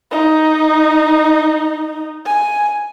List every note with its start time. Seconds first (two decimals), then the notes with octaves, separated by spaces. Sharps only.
0.11 D#4
2.26 G#5